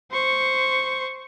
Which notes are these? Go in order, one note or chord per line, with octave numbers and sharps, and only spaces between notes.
C5 C#6